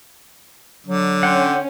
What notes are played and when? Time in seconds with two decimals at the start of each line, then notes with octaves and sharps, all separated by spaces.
0.87 D3 F#3
1.23 C#4 F#5 G5 C6